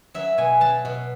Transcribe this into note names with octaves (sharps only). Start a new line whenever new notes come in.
F#3 E5
B2 G#5
F#3 A5
B2